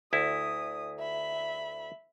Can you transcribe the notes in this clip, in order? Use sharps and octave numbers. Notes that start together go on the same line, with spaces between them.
D2 E4 D#6
E5 B5